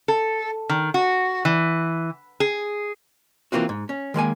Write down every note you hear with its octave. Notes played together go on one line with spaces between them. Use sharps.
A4
D#3
F#4
E3
G#4
E3 A#3 C4 F4 F#4
G#2
C#4
D#3 G#3 A#3 G#5